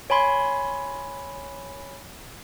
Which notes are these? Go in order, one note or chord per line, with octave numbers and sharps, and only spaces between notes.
C#5 G#5 B5 C6